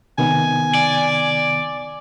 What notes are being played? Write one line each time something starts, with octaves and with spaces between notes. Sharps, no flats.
C3 D#3 B3 G#5
D5